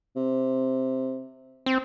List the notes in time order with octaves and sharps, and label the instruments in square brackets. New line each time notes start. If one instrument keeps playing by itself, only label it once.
[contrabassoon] C3
[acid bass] C4